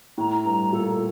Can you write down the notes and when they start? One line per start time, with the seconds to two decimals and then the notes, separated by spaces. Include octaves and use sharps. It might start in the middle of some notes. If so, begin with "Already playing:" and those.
0.18 A2 A#5
0.45 G2 A#5
0.72 A#2 A4